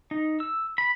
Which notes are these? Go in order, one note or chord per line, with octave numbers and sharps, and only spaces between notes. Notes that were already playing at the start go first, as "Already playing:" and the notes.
D#4
E6
B5